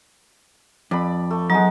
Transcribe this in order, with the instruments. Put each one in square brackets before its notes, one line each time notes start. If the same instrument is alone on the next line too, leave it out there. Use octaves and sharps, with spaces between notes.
[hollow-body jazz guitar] F2 [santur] D5 B5
[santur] A3
[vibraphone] F#3 [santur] G#3 B3 D#4